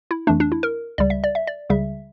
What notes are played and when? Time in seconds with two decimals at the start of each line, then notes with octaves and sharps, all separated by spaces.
0.11 E4
0.27 F2 E3 A3 D4
0.40 D4
0.52 E4
0.63 A#4
0.98 C#2 C#3 G3 D5
1.10 E5
1.24 D5
1.35 E5
1.47 D5
1.70 C#2 C#3 G3 E5